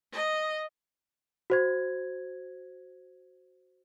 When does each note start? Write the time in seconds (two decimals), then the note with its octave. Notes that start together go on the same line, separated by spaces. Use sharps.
0.12 D#5
1.50 F#4 C5 G#6